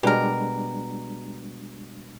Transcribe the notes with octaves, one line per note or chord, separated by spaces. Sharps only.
B2 G3 G#3 D4 G4 A#4